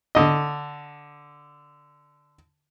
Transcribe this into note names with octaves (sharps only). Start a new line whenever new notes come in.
D3 D#5